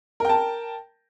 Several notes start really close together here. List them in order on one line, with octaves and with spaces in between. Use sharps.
A#4 G5 A5